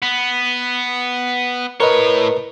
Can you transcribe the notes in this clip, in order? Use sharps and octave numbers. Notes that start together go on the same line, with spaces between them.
B3
A2 A#4 B4 C#5 D#5